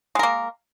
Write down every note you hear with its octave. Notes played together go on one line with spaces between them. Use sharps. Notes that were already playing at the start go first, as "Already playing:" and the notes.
G#3 A#3 A#4